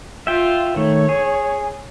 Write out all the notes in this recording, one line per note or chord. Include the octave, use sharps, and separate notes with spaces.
F4 E5 G5
D#3 A3 C#5
G#4